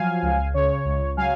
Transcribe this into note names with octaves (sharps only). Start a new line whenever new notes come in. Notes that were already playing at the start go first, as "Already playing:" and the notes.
Already playing: F3 F#3 F5 G#5
C#2
C#3 C#5
C#2
F#3 F5 G#5